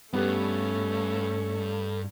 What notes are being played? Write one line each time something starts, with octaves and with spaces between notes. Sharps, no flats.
G2 A3 B3 C#4 G4 A4 B4